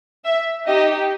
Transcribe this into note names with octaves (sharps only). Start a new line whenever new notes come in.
E5
D#4 G4 D#5